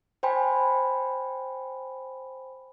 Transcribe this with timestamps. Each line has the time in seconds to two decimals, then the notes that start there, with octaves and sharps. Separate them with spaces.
0.23 C5 G5 G#5 B5